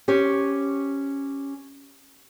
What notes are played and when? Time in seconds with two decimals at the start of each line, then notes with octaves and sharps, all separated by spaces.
0.08 C#4 G4 C5 C#5